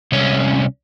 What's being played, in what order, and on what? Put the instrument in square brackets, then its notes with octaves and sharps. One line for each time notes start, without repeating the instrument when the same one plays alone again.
[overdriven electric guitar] C2 C#4